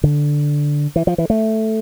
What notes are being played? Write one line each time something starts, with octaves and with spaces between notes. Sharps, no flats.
D3
E3
F3
E3
A3